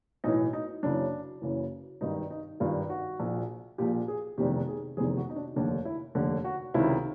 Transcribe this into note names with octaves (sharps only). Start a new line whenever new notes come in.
B1 A2 E3 D#4
D#4
F#1 F#2 C#3 E3 D4
F#1 F#2 C#3 E3
G#1 G2 D#3 D#4
D#4
G#1 G2 D#3 F4
F#4
A#1 A#2
A#1 A#2 G4
G#4
F1 E2 C3 D#3 G4
G#4
F1 E2 C3 D#3 G#4
F#4
D#4
D4
F1 D#2 D3 D4
E4
F1 D#2 D3
F#4
C#2 C3 D#3 E4